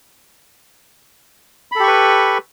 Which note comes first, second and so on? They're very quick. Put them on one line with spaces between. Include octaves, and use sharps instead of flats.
B5 A4 G4 C#6 B4